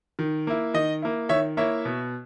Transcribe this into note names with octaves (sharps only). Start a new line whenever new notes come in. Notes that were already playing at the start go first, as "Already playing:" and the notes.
D#3
A#3 E4
D#3 D#5
A#3 E4
D#3 C#5 E5
A#3 E4 C#5 E5
B2